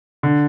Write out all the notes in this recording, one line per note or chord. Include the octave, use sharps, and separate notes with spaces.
D3